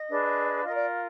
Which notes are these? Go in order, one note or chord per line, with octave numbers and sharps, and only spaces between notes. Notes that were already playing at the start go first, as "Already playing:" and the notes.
Already playing: D#5
D4 G#4 B4
F4 A#4 D#5
D5